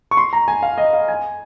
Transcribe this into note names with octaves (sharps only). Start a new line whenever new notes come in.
C#6
C6
A#5
G#5
F5
D#5
F5
G#5